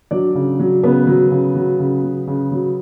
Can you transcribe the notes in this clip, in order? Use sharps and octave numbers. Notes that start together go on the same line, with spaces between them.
F#3 D4 D5
C#3
F#3
C#3 B3 B4
F#3
C#3
F#3
C#3
F#3
C#3
F#3